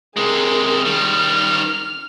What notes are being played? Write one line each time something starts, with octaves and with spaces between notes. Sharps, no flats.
C3 G#3 G#4 A#4
D#3 G3 F6